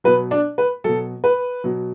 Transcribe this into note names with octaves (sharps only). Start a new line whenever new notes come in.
B2 F#3 B4
D4 D5
B4
B2 F#3 A4
B4
B2 F#3